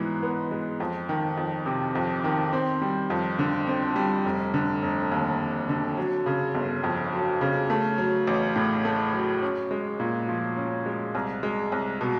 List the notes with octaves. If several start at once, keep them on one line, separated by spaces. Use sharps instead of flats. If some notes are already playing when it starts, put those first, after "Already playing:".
Already playing: G#2 E3 G#3 B3
B3
G#3
F2
D#3
F2
C3
F2
D#3
C4
G3
F2
D3
C4
G3
F1
D3
F1
D#2
F1
D3
F#3
C#3
G1
F2
F#3
C#3
A3
F#3
A1
A2
A3
F#3
C#4
G#3
A#2
F3
C#4
G#3
C2
G#3
C2
B2